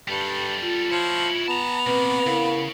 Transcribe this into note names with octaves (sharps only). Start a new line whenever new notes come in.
G2 G3 A4
F4
F3 E4 C#5
B3 A5 A#5
B2 A#3 C4 B4
C#3 E4 A#4 F5